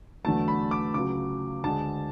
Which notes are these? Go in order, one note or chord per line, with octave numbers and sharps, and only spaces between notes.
E2 D3 F#3 A3 A5
B5
D6
C#2 C#3 F#3 D6
D2 D3 G#3 A5